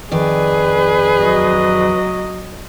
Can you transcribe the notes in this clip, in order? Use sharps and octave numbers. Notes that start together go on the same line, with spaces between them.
F2 D#3 G#4 B4 D5
F#3 D#5